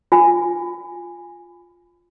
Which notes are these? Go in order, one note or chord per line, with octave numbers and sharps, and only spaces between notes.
F4 G#5